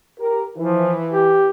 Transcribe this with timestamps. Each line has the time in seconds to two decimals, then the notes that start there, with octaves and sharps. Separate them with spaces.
0.20 G4 A#4
0.57 E3 F3
1.11 G4